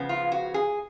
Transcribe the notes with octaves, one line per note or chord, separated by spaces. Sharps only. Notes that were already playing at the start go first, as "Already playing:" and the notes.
Already playing: C#3 F3 G#3 B3
F4
F#4
G#4